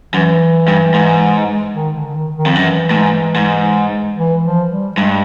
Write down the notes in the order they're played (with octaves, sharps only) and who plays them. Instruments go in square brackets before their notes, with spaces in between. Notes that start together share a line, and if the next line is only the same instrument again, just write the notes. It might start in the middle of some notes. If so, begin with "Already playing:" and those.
[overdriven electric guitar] F#2 [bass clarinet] E3
[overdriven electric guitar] G2
G#2
[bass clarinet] D#3
D3
D3
D#3
D#3
[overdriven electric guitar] F2
[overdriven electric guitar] F#2 [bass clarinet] E3
[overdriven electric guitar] A2
G#2
G#2
[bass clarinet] E3
F3
G3
[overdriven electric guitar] G2 [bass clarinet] G#3